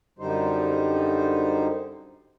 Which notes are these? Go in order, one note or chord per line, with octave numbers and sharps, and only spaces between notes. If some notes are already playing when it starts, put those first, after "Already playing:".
F#2 D3 G3 D#4 C5